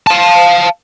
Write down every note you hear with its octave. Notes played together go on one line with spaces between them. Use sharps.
F5 A5